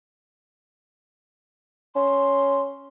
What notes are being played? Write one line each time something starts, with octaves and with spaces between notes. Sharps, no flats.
C#4 C6